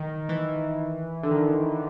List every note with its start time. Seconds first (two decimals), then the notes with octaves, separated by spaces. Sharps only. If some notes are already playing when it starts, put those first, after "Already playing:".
Already playing: D#3
0.29 E3
1.23 D3
1.31 D#3